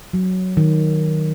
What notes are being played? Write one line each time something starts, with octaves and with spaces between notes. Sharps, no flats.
F#3
D#3